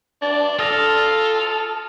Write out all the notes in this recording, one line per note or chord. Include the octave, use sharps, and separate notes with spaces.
D4 A6
F4 A4 D#6 F6 A#6